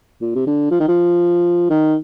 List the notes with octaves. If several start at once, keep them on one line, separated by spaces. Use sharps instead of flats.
A#2
C3
D3
F3
D#3
F3
D#3